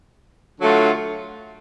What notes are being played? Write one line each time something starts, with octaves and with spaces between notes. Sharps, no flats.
D3 F#3 A3 F4